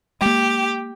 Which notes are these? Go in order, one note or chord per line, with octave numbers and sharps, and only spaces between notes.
G#3 A#3 G4